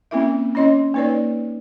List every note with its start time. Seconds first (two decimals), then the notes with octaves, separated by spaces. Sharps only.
0.11 A#3 C4 C#4 E4 A#4 E5
0.55 C#4 E4 C#5 D#5 C6
0.94 A#3 D#4 B4 C#5 D5